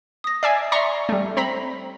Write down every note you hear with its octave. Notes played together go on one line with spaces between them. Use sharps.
D#6 A#6
D5 E5 G#5 C7
D5 E5 A#5 C6 C#6
G3 A3
C4 A#5 B5